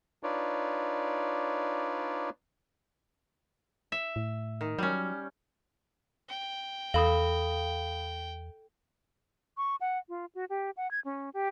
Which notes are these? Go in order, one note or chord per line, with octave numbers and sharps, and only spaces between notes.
D4 D#4 F4 B4 C#5 D5
E5
A2
D#3
F#3 G3 C#4
G5
E2 A4 F5 B5 D#6
C#6
F#5
F4
F#4
G4
F#5
G#6
C#4
G4